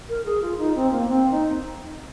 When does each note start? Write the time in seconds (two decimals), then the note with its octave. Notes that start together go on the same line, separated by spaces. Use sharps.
0.09 A#4
0.25 G#4
0.42 F4
0.58 D#4
0.75 C4
0.91 A#3
1.07 C4
1.31 D#4